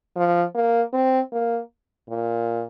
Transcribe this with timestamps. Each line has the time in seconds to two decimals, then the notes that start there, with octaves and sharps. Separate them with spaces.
0.16 F3
0.55 A#3
0.93 C4
1.32 A#3
2.09 A#2